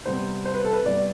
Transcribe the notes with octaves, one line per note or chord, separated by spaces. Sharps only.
C3 G3 B3 C5
C5
B4
A4
B4
C3 G3 B3 D5